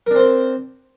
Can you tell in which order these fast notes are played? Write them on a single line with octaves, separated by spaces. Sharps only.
A#4 D4 C4 C5